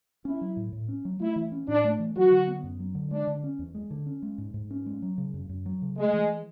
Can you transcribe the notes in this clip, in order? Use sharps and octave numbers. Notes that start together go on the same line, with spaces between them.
C#4 E4
F#3
A2
A2
C#4
F#3
A3 E4
E3
C#4
A2 D4
A3
E3
F#3 F#4
D3
B3
F#2
F#3
D3
G#3 D4
D3
C#4
E2
G#3
D3
C#4
G#3
G#2
G#2
C#4
G#3
F#3
C#3
F#2
F#2
F#3
C#3
G#3 A3
E3